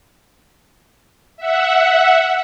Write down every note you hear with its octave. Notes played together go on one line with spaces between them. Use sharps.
E5 F#5